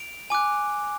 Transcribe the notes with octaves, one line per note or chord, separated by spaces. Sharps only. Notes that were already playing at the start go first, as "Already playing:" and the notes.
Already playing: D7 F7
G#5 D6 F#6